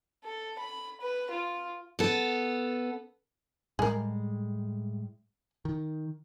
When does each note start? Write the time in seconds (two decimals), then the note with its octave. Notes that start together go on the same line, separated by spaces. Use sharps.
0.24 A4
0.59 B5
1.01 B4
1.31 F4
1.99 B3 A4
3.79 A2 G3 G#3 G#4 A#4
5.65 D#3